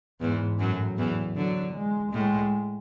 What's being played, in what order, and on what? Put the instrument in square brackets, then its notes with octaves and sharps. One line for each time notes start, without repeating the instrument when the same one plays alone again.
[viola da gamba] E2 E3 [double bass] G#2
[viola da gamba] F#2 F#3 [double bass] A2
[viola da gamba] E2 E3
[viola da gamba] D3 [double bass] F#3
[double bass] G#3
[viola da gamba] A2 [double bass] G#3